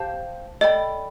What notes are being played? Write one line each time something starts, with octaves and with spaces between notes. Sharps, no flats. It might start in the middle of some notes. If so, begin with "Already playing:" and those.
Already playing: G4 C5 F5 A5
A4 D5 D#5 G5 B5